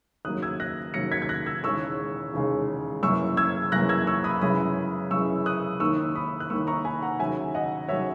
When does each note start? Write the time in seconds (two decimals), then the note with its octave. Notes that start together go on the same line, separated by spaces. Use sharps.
0.25 D#2 C#3 F#3 A#3 D#6 F#6
0.42 E6 G#6
0.60 F#6 A#6
0.94 D#2 C#3 F#3 A#3 A#6 C#7
1.12 G#6 B6
1.22 G#6
1.29 F#6 A#6
1.46 E6 G#6
1.64 E1 D#2 C#3 G#3 C#6 E6
2.34 E1 D#2 C#3 G#3
3.03 F#2 C#3 E3 A#3 C#6 E6
3.37 E6 G#6
3.72 F#2 C#3 E3 A#3 F#6 A#6
3.89 E6 G#6
4.07 C#6 E6
4.24 B5 D#6
4.41 F#2 C#3 E3 G#3 B5 D#6
5.11 F#2 C#3 E3 G#3 C#6 E6
5.46 D#6 F#6
5.80 D#2 D#3 A#3 C#6 E6
6.15 B5 D#6
6.40 F#6
6.50 D#2 D#3 A#3 C#6 E6
6.67 A#5 C#6
6.85 G#5 B5
7.02 F#5 A#5
7.19 D#2 C#3 F#3 E5 G#5
7.55 D#5 F#5
7.88 D#2 C#3 F#3 C#5 E5